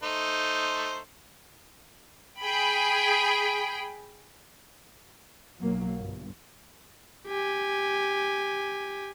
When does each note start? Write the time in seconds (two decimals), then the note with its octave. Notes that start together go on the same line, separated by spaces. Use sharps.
0.03 A3 D#4 C5
2.40 G#4 G5 B5
5.61 B1 F#3 A#3
5.99 G1 G2
7.27 G4 G#5